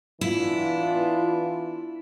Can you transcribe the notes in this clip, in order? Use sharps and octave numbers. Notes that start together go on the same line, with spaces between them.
E3 B3 D4 E4 F4